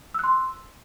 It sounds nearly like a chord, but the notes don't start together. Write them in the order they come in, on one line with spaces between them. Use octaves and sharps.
E6 F#6 C6